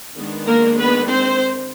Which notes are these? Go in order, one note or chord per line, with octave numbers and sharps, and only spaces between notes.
D#3 G#3 B3 D4
A#3 A#4
B3 B4
C4 C5